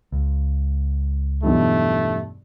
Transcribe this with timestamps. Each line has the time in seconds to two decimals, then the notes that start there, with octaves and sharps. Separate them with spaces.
0.12 C#2
1.43 B1 E2 G2 A3